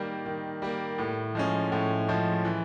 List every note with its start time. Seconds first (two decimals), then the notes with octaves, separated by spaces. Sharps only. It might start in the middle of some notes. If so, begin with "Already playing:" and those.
Already playing: D#3 G3 A#3
0.26 D#3
0.62 G3 A#3
0.98 A2
1.35 F3 G#3 C#4
1.72 A2
2.08 F3 G#3 C#4
2.45 E3